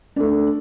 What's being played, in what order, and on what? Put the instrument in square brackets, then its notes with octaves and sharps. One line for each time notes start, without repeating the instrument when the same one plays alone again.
[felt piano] A3 D4